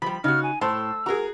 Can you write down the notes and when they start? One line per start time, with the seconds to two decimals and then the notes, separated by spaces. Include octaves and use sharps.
0.02 F3 G3 B5
0.24 C#3 D#4 F#4 F6
0.43 G#5
0.61 A2 C5 A5 C6 E6
1.06 F#4 G#4 A#4 A#5